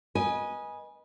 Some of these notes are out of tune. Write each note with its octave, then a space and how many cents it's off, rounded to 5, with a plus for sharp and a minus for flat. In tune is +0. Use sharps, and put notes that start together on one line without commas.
B4 -30 D#5 +0 G#5 +0